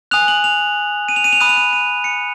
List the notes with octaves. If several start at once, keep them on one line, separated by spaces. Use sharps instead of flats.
G#5 D#6 F#6 F7
F#7
F7
D#7
F7
D#7
F7
B5 D#6 F#6 D#7
F7
D#7
D#7
C#7